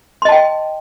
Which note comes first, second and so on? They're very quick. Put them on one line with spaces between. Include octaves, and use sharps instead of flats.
C6 D#5 A5 G5